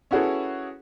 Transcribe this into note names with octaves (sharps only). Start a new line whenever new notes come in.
C#4 E4 F#4 G#4 A4 B4